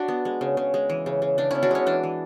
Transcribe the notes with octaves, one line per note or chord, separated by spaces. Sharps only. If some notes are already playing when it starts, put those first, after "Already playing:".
Already playing: D4 F#4
B3
G#3
C#3
C#3
G#3
E3
C#3
C#3
C#3 D4
B3 C#4 E4
D4 F#4
G#3 C#4
E3 D4
E3